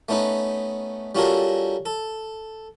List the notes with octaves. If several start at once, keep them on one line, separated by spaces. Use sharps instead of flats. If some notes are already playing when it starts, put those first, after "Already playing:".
A3 B3 C#4 D#4 B4
G3 C#4 F4 F#4 A4 A#4
A4